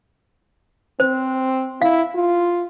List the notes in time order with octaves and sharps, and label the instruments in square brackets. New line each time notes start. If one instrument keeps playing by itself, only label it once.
[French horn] C4 [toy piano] C5
[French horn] E4 [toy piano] F5
[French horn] F4